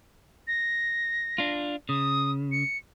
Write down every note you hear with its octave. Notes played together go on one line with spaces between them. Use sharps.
A#6
D4 F4
C#3 D#6
C#7